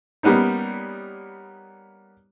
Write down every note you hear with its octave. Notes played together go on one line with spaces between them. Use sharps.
G3 A#3 B3 C#4 D#4